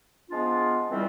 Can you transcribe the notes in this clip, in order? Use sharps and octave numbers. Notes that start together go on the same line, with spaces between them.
F3 G#3 B3 D4 F4
C#3 E3 G3 C4 F4